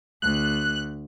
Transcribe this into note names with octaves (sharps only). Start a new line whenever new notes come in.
D2 F#6